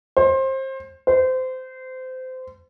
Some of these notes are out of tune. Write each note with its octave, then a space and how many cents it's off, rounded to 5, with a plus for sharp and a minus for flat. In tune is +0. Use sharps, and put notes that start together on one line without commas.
C5 +25
C5 -25